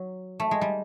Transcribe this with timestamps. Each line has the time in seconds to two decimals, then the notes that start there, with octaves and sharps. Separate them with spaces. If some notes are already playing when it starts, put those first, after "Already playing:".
Already playing: F#3
0.40 A3
0.51 G#3
0.61 G3